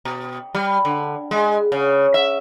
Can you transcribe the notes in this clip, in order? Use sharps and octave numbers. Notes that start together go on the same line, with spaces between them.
B2
G3
D3
G#3
C#3
E5